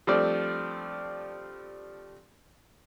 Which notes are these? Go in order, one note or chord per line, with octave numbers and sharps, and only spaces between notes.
F3 G3 A3 C4 D4 D5